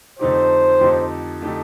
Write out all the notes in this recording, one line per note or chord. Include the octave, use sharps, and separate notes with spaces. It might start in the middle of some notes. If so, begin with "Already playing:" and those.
F2 D3 A3 D#4 G4 C5
F2 D3 A3 D#4 G4
D3 A3 D#4 G4